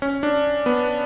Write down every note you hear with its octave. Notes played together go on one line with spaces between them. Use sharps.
C#4
D4
B3